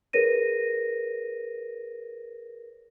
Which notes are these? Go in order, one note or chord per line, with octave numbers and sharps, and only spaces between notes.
G#4 A#4 B4 C#5 A#6 D#7